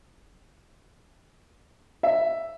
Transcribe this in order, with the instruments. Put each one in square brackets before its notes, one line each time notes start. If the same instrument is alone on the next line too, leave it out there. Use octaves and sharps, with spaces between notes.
[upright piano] E5